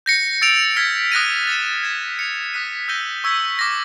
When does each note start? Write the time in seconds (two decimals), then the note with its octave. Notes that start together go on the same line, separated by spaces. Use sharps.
0.06 G6 A#6 C#7
0.41 E6 A6 D7 F7
0.77 F6 G#6 B6 D7
1.12 D#6 F#6 A#6 D#7
1.47 A6 C#7 E7
1.83 G#6 B6 E7
2.19 F#6 A6 C#7 F7
2.53 D#6 F#6 B6 D#7
2.88 E6 G6 A#6 D#7 G7
3.24 C#6 E6 G#6 B6
3.59 D6 F6 A#6